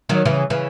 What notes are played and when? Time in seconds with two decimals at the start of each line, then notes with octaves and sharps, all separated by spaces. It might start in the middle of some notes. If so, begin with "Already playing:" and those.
0.09 D#3 F#3
0.25 C#3 E3
0.50 C#3 E3